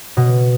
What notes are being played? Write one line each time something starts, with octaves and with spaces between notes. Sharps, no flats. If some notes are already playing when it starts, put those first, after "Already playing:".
B2